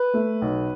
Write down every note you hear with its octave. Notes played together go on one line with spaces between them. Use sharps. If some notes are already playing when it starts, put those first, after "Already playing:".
Already playing: B4
A3
B1